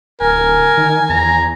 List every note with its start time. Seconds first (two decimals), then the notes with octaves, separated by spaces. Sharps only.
0.21 D1 A#4 G#5
0.77 D#3
1.09 E2 A#5